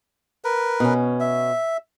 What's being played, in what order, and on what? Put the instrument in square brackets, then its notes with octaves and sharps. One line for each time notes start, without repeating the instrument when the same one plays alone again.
[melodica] A#4 B4
[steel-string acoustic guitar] B2 C#4
[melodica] E5